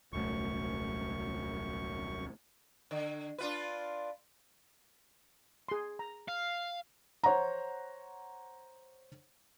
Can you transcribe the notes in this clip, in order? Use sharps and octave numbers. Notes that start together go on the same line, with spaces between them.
D#1 C2 F#2 A3 C#6
D3
D4 F4 B4
G#4 C6
A#5
F5
C5 C#5 F#5 A#5